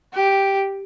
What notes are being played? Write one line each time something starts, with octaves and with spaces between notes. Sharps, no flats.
G4